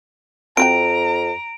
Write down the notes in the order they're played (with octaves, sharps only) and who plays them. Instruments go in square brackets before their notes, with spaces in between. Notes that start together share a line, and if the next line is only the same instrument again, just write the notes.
[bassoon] F2 [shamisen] C4 F#4 G5 [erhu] A#5 [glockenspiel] D7